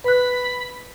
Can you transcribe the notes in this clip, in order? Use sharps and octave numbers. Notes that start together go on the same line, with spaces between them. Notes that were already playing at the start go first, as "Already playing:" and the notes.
B4 B5 F#6